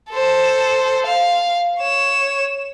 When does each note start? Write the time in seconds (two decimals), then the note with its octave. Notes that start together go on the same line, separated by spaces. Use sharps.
0.11 A4 C5
1.06 F5
1.79 C#5 E7